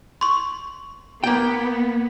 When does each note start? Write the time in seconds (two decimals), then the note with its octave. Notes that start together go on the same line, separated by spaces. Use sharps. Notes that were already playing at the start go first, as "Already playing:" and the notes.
0.21 C6 C#6
1.24 A#3 B3 G5